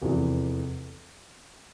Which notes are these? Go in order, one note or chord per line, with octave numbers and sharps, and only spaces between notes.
F1 E2 E3